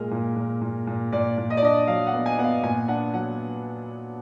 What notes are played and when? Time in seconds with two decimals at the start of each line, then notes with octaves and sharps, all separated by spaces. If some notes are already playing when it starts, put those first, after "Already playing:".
Already playing: A#2 G#3 A#4
0.11 A#2
0.36 A#2
0.61 A#2
0.87 A#2
1.13 A#2 D5
1.38 A#2
1.50 D#5
1.57 D5
1.62 D4 D#5
1.88 F#3 F5
2.07 F#5
2.13 B3
2.26 G#5
2.39 B3 F#5
2.44 F5
2.63 A#2 G#5
2.88 D4 F#5
3.14 F#3 F#5